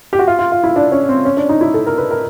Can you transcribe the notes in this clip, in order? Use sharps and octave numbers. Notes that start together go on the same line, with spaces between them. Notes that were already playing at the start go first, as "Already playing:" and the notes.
G4
F#4
F4
F4
F4
E4
D4
C#4
C4
C#4
D4
D#4
E4
A4
A#4
B4
A#4